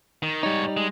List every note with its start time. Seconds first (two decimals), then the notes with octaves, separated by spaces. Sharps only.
0.23 D#3
0.43 G#2 G3 D#4 C#5
0.77 G#3